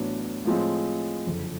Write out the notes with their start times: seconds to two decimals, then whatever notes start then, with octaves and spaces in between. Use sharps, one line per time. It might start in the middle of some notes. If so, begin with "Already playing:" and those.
Already playing: A1 A2 F#3 B3 D4
0.45 A2 F3 G#3 C4
1.26 F#1 F2 D3